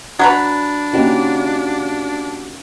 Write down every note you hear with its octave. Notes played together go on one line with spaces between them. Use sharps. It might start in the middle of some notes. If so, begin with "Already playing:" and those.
F#3 D4 F#4 B4 A#5
A#3 C#4 D#4 F#4 G4